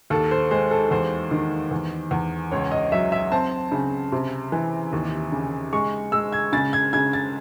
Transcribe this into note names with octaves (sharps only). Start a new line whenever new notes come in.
D#2 A4
C5
G#3 C5
A4
E2 C5
D#3
E2
E2
C#2 C#5
D#5
F#3 E5
E5
C4 A5
C#3
C3
E3
D#2
C#3
G#3 C#6
G#3 E6
G#6
C#3 A6
G#6
C#3 G#6
A6